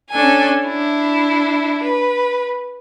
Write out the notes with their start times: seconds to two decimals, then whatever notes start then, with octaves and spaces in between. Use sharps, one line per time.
0.12 C#4 D4 A4 G#5
0.66 D4 E4
1.83 B4